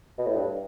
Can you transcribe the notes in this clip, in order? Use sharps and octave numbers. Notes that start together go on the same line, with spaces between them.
B2
A2
G2